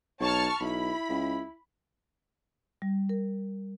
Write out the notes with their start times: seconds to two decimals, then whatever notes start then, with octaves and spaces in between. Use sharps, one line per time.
0.20 B1 C#5 A5 C#6 F6
0.60 B1 E4 B5
1.10 C#2
2.82 G3
3.09 A#4